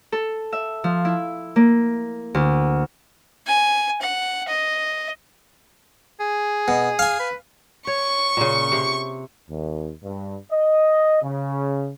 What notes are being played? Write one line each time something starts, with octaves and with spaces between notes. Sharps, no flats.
A4
E5
F3
E4
A#3
D2
G#5
F#5
D#5
G#4
B2
F5 G#5
B4
C#5 C#6
A#2 C#3
C3
D#2
G2
D#5
C#3